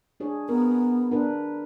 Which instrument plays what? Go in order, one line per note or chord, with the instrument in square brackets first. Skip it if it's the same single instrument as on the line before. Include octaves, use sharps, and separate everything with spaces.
[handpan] D4 G#4 C#5
[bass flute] B3 [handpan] A#4
[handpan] D4 A#4 B4